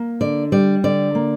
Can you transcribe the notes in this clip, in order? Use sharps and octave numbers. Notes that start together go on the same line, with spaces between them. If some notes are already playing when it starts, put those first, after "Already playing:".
Already playing: A#3
D3 D5
G3 D5
D3 D5
A#3